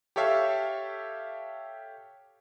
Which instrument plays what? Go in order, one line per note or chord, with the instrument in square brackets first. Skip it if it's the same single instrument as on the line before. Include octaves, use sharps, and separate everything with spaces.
[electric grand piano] G4 A4 C#5 E5 F5